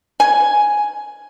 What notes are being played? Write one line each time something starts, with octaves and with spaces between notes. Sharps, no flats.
G#5